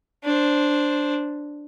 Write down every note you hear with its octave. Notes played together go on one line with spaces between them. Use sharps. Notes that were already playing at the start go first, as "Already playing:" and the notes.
D4 C5